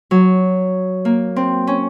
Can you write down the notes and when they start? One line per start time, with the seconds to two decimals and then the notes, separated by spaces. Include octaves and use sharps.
0.11 F#3
1.05 A#3
1.36 C4
1.67 C#4